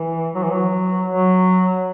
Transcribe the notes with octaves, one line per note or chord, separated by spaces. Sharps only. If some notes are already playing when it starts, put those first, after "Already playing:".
Already playing: E3
F#3
E3
F#3
F#3